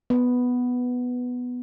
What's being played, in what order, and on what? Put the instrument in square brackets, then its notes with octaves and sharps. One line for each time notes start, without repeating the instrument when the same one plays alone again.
[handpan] B3